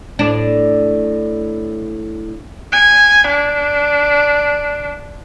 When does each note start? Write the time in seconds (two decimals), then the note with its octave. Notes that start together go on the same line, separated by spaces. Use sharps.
0.19 A2 D4
2.72 G#5
3.27 D4